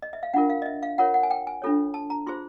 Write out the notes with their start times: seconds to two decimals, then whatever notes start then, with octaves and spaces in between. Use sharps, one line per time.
0.02 D#5
0.13 E5
0.23 F5
0.33 D4 F4 A#4 F#5
0.50 F5
0.62 D#5
0.66 E5
0.83 F5
0.98 F4 A#4 C#5 F#5
1.14 F#5
1.23 G#5
1.31 G5
1.47 G#5
1.62 D4 F4 A4 C#5
1.94 A5
2.10 A#5
2.27 F4 G#4 C5 C6